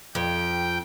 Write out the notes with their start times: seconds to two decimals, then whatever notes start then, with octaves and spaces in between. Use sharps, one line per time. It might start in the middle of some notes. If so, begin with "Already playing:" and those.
0.15 F2 G5